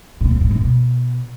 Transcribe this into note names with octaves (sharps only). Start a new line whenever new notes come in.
A#2
F2
A2
F#2
B2